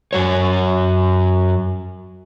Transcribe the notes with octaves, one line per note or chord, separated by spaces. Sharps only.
F#2 F#3 C#5